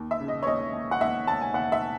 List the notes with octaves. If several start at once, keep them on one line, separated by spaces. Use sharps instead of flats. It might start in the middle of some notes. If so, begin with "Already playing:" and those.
Already playing: D#2
E5
C#3
D#5
C#5
D#2 D#5
D#2
F#5
D#2 E5
D#2 A5
G#5
D#2 F#5
E5